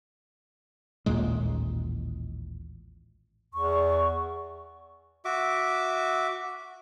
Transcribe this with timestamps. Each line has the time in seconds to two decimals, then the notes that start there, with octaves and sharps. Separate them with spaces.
1.06 A1 D#2 A#2 G#3
3.54 E2 C#6
5.25 F#4 E5 D6